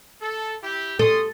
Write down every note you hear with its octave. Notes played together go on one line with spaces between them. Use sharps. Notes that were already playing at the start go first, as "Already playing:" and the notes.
A4
E4 G4
C#4 A4 C6 D#6